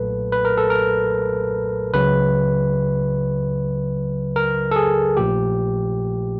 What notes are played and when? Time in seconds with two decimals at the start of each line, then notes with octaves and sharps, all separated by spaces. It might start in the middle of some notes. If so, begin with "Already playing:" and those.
Already playing: B1 A#2 F#3 A3 A4 B4
0.32 B4
0.45 A#4
0.58 A4
0.70 A#4
1.94 C#2 C#3 F#3 B4
4.36 A#4
4.71 A4
4.76 G#4
5.17 A#1 A#2 F3 A3 G4